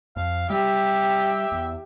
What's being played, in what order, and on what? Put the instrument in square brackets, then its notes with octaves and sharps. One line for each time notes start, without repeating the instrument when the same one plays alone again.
[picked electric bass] F2 [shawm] F5
[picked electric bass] G3 [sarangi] G4 [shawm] E5
[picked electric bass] E2